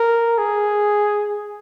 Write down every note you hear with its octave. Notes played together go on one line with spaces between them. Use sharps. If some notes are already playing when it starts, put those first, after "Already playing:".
Already playing: A#4
G#4